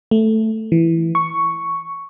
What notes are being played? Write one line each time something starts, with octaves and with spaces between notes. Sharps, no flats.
A3
E3
C#6